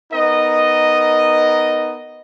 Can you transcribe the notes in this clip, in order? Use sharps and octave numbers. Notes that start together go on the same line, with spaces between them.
B3 D#4 A#4 D#5